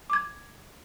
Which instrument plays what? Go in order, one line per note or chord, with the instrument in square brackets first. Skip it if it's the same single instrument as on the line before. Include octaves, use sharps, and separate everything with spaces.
[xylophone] D6 G#6